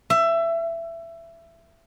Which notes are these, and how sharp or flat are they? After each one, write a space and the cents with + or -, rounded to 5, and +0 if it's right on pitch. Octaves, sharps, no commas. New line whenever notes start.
E5 +20